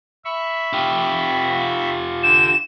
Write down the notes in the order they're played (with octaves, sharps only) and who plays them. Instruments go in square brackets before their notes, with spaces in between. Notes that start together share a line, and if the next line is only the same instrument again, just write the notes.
[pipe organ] E5 B5 C#6
[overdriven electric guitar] F4 G4
[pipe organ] D3 G5 [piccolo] E7